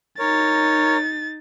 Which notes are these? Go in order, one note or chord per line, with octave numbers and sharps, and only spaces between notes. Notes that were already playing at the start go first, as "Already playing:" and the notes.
D#4 A#4 C#5 A6